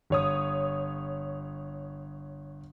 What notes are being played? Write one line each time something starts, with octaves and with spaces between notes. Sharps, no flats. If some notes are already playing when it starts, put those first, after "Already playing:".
G1 C#5 D#6